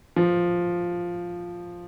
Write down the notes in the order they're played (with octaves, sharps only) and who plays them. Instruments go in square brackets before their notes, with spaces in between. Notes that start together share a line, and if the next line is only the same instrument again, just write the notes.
[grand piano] F3